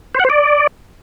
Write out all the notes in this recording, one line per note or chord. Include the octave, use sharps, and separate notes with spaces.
C5
F#5
C5
D5